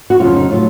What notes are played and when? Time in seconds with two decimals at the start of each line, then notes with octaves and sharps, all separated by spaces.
0.10 F#4
0.20 F2 C#3 F#3 F4
0.36 D#4
0.51 A2 F#3 F4